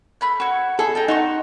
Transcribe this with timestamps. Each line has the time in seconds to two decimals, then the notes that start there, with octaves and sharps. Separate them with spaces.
0.21 A3 B5 F#6
0.40 F#4 C#5
0.79 G#4 A4 D#5
0.95 D#4 G5 A5
1.08 D#4 F#4 C6 C#6